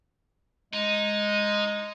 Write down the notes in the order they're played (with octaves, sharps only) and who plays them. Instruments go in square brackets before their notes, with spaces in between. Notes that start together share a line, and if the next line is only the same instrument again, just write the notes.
[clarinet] G#3 [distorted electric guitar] D#4